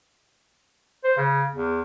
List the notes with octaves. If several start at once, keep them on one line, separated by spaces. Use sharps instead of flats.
C5
C#3
E2